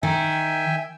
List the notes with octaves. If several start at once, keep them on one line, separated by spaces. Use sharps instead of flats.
D#3 E5 G5 G#5